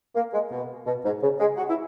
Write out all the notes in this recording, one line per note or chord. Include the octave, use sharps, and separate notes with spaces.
A#3
G#3
B2
B2
G#2
C#3
G#3
F#4
E4